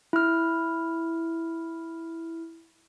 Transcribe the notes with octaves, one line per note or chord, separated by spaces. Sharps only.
E4 F6